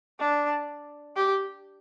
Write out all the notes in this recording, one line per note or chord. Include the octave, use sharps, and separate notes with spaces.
D4
G4